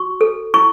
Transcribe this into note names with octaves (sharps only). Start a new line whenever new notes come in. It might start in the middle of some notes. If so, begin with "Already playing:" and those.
Already playing: F#4 C#6
A4
E4 C#6